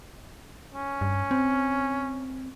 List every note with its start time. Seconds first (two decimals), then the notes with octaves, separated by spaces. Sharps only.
0.74 C#4
1.01 G2
1.31 C4